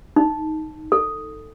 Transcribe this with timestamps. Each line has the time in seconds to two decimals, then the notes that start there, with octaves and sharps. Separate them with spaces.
0.16 D#4
0.92 A4